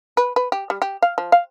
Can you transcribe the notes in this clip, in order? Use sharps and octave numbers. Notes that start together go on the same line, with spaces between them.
B4
B4
G4
G3
G4
F5
F3
F5